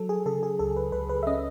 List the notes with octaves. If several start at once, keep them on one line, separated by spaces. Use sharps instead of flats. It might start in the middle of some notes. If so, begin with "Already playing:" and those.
Already playing: F#3 A4
G#4
C#3 A4
G#4
C#2 A4
B4
C#2 B4
B4
E5
C#4 D#5